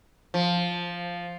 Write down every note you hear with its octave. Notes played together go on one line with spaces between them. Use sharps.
F3